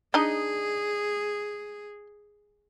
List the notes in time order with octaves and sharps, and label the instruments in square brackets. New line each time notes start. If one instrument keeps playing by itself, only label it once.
[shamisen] D4 D#4 D#5 [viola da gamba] G#4